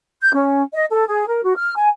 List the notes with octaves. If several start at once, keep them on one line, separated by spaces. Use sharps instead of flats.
G6
C#4
D#5
A4
G#4
A#4
F#4
F6
G#5